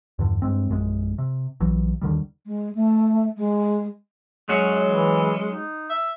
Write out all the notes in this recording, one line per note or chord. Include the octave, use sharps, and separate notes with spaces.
E2 G2 D3
G2 G#3 C4
A#1 F#2 G#3
C3
A#1 E3 F#3
D#2 D3 D#3 G3
G#3
A3
G#3
F#3 G#3 C#4 F#4
E3
D#4
E5